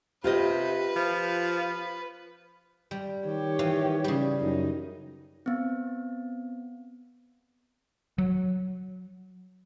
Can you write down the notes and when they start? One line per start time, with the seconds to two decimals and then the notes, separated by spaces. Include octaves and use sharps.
0.24 C3 F4 G4 B4 D#5
0.96 F3
2.91 G3
3.26 D#3 G4 C#5
3.59 E3 F5
4.04 C#3 G3
4.41 F#2 D#4
5.46 B3 C4
8.18 F#3